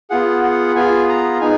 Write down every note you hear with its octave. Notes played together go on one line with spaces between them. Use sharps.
B3 F4 G#4 F#5
F#5
B3 F4 G#4 G#5
A#5
B3 D#4 G#4 G#5